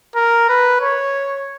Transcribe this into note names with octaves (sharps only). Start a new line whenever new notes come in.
A#4
B4
C#5